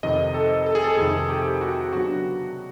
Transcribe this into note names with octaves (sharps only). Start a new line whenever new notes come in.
F2 C3 D#3 D#5
A4
A4
G#4
A4
F2 C3 D#3 G#4
G4
F#4
C#3 F#3 B3 D4 F#4